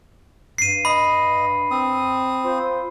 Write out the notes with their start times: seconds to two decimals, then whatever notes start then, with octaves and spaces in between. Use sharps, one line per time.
0.58 G2 C7 D#7
0.85 D#5 B5
1.71 C4 D#6
2.45 F4 C5